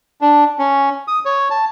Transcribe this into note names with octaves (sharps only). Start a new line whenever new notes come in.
D4
C#4
D#6
C#5
A5